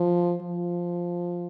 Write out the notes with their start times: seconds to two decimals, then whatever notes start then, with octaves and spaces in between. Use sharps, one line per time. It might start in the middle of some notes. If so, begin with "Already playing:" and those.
Already playing: F3
0.42 F3